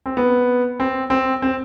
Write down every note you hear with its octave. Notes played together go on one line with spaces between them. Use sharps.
C4
B3
C4
C4
C4